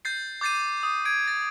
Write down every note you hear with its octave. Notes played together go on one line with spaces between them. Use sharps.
G6 A6 C7
D6 G6 A6 C7 D#7
D#6
G#6 D7
A6